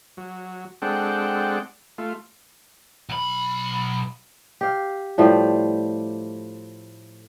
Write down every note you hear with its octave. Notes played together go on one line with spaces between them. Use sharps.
F#3
G#3 C4 D4 A4 F#5 G5
A3 F4
B1 B5
G4 F5
A2 F3 G3 A3